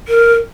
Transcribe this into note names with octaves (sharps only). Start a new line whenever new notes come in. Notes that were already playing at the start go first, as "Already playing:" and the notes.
A#4